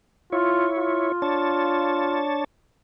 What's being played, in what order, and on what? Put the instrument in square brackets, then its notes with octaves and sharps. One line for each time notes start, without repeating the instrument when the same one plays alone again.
[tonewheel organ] E4 C#5 [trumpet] F4
[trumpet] F4
[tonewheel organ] D4 C#5 A5